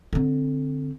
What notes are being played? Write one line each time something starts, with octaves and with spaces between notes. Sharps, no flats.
D3 C4